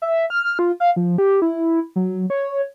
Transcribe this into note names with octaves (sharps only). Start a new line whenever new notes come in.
E5
F6
F4
F5
F3
G4
E4
F#3
C#5